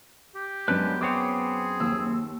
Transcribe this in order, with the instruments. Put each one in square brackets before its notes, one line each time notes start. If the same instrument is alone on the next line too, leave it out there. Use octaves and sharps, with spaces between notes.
[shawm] G4
[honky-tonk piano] F#2 [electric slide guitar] G#3 D4 B4 [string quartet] B3
[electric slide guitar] F#2 C4 C#5 [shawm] G#4 [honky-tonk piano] D6
[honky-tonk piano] D#2 E6